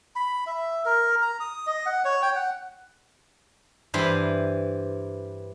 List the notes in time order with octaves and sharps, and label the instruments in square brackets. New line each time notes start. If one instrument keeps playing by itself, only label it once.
[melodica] B5
E5
A#4
A#5
D#6
D#5
F#5
C#5
G5
F#5
[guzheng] G2 E3 C5 B5 C6